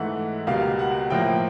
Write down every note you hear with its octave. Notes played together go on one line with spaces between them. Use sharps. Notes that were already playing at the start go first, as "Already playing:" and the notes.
Already playing: G#2 E3 A3 F#5
C#2 B2 G3 A#3 F5
F#5
A2 F3 A#3 G5